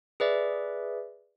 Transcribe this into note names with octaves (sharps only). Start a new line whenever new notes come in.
G#4 B4 D5 E5